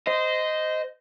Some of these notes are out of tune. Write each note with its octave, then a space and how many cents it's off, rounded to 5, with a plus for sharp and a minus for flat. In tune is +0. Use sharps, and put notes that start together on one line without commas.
C5 -20 D#5 +0